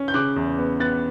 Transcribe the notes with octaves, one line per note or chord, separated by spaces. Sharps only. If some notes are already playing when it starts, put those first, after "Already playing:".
Already playing: C#4
G6
C#3 D6 F#6
E2
B3
B3 F#6 A6